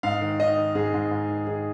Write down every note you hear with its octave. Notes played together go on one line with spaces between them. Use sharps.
G#2 F5
D#3
D#3 D#5
D#3
G#2 G#4
G#2
G#2
D#3
D#3 G#4